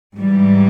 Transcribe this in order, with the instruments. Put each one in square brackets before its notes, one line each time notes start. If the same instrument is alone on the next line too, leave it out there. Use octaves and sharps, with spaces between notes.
[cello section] G#2 E3 G3